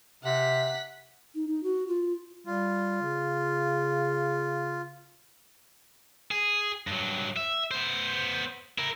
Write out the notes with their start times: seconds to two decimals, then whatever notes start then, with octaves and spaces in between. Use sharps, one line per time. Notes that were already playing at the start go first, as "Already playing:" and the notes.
0.23 C3 F#5 B6
1.35 D#4
1.48 D#4
1.63 F#4
1.88 F4
2.45 G3 F4
3.02 C#3
6.31 G#4
6.87 G2 F#3
7.36 E5
7.71 B3 C5
8.78 E4 A#4